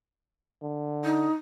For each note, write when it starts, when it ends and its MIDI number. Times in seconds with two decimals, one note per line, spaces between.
0.63 1.27 50
1.05 1.33 63